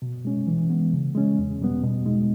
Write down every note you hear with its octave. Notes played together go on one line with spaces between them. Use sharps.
B2
G#3 C#4
E3
G#3 B3
C#3
G#3 C#4
E2
B2 G3 B3
B2
G#3 D#4